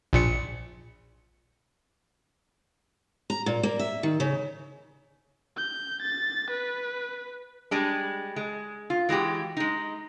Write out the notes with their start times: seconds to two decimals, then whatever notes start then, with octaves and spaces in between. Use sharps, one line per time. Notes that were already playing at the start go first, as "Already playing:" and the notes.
0.13 A#1 A#2 C#7
3.30 A#5
3.46 A#2
3.63 A#3
3.79 E5
4.03 D#3
4.20 C#3
5.57 G6
6.02 A6
6.50 B4
7.71 G3 G#3 D4
8.36 G#3
8.90 F4
9.09 E3 G#3 F#4 G4
9.57 G#3 D#4